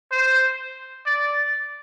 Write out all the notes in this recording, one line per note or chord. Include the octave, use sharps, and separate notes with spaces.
C5
D5